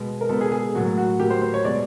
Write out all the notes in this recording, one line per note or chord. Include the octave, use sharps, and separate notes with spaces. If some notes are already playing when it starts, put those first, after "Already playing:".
Already playing: B2 G#3 B3
A#4
B2 G#3 B3 A4
G#4
G#4
A2 F#3 A#3 F#4
F#4
A2 F#3 A#3 G4
C5
C5
C#5
B2 G#3 B3 D5